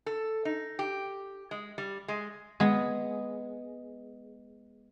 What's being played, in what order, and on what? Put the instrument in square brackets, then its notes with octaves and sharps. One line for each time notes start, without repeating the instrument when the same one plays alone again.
[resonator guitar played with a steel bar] A4
D#4
G4
G#3
G3
G#3
[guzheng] G#3 B3 G#4